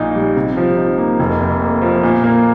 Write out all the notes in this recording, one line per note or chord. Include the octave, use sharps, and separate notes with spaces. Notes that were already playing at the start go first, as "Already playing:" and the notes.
Already playing: A#1 A#2 D#4
G3
C3
F3
D#4
A#3
F1
F2
A#3
F3
A#2
A#3